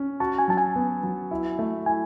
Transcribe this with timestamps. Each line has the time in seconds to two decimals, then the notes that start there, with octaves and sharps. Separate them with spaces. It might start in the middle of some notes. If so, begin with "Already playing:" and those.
Already playing: C#4
0.20 F#4 A5
0.39 G#5
0.48 F#3 A5
0.57 G#5
0.76 B3
1.03 F#3
1.31 E4
1.59 A3
1.86 E4 G#5